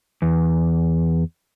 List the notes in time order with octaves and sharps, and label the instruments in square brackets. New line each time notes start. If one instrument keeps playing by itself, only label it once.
[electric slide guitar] E2